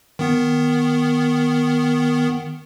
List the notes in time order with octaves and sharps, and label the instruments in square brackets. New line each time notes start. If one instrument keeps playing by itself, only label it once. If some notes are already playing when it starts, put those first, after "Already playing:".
[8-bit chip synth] D#3 B3